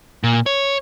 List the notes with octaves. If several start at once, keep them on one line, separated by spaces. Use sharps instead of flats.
A#2
C#5